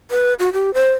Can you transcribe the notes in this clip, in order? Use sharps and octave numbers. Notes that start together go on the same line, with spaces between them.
B4
F#4
G4
C5